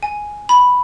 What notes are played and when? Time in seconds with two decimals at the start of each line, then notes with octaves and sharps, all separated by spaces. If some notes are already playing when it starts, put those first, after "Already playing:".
0.03 G#5
0.49 B5